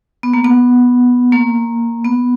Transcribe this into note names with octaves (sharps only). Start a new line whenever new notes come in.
B3
A#3
B3
A#3
B3